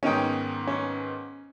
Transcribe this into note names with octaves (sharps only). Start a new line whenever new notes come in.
G#2 D#3 B3 C#4 D#4 G5
C#4